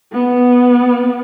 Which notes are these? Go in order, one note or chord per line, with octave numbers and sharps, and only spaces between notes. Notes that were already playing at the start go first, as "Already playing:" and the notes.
B3